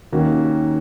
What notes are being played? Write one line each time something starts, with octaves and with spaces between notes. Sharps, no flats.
D#2 D#3 A#3 C#4 F#4